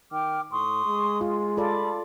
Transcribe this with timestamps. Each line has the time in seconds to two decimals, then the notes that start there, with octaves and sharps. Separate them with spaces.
0.11 D#3 G5 D6 F6
0.51 A2 C6 C#6 D#6
0.86 G#3
1.21 F4
1.57 F4 A4 D5 B5